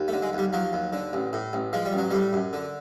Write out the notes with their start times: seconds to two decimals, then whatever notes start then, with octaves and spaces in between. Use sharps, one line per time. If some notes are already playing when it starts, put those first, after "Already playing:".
Already playing: D#2
0.08 A3
0.13 D3
0.22 G#3
0.33 D#2 G3
0.53 F3 F#3
0.73 D#2
0.93 D3
1.13 A1
1.33 A2
1.53 A1
1.73 F3 G#3
1.85 G3
1.93 A1
1.98 F#3
2.11 A2 G3
2.33 F#2
2.53 D3